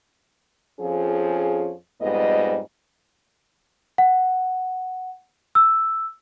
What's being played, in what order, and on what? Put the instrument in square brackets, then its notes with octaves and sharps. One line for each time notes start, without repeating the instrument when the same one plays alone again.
[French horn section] F2 F3 C#4 G#4
F2 G#2 G3 B3 D#5
[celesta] F#5
E6